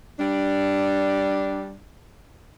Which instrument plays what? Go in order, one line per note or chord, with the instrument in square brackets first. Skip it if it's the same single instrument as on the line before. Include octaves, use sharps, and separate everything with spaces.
[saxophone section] G3 D4